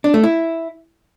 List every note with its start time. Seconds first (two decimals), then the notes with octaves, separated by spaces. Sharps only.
0.04 D4
0.14 A3
0.23 E4